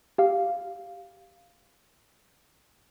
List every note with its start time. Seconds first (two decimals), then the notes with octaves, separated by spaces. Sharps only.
0.18 G4 F5